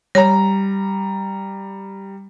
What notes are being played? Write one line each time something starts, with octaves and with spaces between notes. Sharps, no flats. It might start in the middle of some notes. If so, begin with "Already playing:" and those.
G3 C#5 A#5